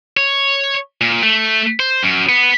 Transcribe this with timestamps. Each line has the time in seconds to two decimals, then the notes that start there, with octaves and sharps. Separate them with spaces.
0.17 C#5
1.01 A#2
1.23 A3
1.80 C5
2.03 F#2
2.29 B3